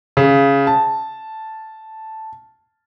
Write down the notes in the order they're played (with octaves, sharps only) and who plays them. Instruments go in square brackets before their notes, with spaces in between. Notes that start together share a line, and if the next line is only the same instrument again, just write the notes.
[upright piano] C#3
A5